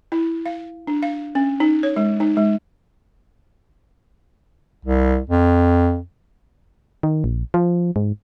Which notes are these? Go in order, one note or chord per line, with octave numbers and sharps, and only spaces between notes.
E4
F5
D4
F5
C#4
D#4
C#5
G#3
D#4
G#3
C2
F2
D#3
A#1
F3
G#2